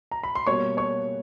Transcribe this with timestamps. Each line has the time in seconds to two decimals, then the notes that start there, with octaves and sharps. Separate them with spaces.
0.11 A#5
0.23 B5
0.35 C6
0.47 B2 G3 A#3 C#5 C#6
0.77 C#5 C#6